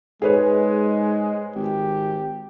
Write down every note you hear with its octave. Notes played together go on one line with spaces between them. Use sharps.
G#2 G#3 G#4 B4 C#5
G#1 G4